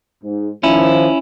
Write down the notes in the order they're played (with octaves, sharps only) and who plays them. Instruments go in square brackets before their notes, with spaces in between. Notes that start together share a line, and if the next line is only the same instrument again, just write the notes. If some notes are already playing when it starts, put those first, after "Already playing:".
[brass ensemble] G#2
[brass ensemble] D#3 F3 [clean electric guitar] C#4 E4